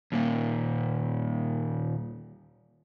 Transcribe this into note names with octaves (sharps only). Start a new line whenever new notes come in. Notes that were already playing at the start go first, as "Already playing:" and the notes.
D#2 A#2